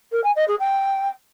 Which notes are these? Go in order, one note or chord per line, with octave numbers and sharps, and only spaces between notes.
A#4
G#5
D#5
G#4
G5